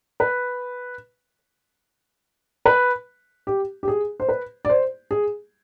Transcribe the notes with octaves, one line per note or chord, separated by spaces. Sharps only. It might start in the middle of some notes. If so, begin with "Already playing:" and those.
B4
B4
G4
G4
G#4
C5
B4
D5
C5
G#4